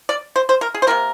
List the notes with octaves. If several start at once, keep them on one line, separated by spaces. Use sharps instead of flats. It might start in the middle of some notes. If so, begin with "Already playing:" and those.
D5
C5
C5
A#4
G#4
C5
C3 G3 A#3 A#4